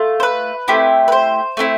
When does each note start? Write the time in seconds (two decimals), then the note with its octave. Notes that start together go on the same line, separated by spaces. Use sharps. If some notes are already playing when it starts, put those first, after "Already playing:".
Already playing: A3 F4
0.20 C5
0.23 B4
0.68 A3 C4 E4 G4
1.08 B4
1.12 C5
1.57 A3 C4 E4